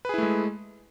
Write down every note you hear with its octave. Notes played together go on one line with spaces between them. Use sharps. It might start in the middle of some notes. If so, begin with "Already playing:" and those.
G#3 A3 E4 G#4 B4